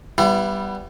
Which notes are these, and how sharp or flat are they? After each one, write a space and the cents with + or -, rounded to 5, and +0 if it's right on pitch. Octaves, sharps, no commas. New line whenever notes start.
G3 -5 B3 +0 E4 +40